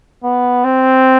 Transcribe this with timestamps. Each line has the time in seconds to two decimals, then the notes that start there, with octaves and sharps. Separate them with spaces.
0.24 B3
0.65 C4